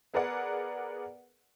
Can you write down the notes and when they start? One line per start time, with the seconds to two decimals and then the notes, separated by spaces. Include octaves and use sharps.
0.14 B3 G#4 A#4 B4 D5 F#5